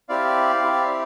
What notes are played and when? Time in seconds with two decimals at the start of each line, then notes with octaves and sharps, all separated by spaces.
0.09 C4 E4 G4 D5 F5
0.62 C4 E4 G4